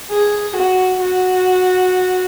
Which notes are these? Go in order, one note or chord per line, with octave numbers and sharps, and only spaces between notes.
G#4
F#4
F#4